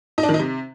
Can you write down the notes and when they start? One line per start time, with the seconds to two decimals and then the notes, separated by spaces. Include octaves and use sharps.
0.18 D#4
0.23 D4
0.29 D#3
0.34 D#4
0.39 C3